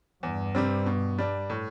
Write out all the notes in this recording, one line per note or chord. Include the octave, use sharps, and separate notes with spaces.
E2 G2
C3 G3 C4
B2
G3 D4
A2